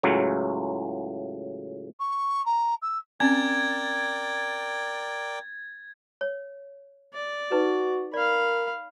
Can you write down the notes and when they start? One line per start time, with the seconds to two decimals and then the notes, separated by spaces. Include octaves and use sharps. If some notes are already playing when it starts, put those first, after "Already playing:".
0.03 C#2 A2 C#3 F#3
2.00 C#6
2.46 A#5
2.82 E6
3.20 C4 C#4 A#4 D5 G5 G#6 A6
6.21 C#5
7.14 D5
7.52 D#4 F#4 B4
8.14 A#4 D5 F5 B5